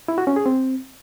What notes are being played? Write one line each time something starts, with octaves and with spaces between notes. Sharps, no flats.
E4
F#4
C#4
G#4
C4